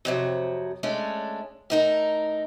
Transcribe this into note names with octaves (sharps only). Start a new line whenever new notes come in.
F2 C3 F#3
G#3 A3 C#4 D4
A2 D#4 A#4